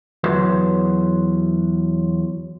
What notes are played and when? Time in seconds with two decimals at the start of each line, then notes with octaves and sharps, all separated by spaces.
0.24 E2 F#3 B4 C5